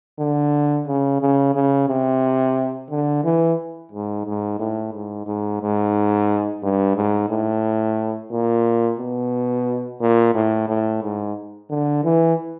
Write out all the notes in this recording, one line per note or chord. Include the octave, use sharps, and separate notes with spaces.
D3
C#3
C#3
C#3
C3
D3
E3
G#2
G#2
A2
G#2
G#2
G#2
G2
G#2
A2
A#2
B2
A#2
A2
A2
G#2
D3
E3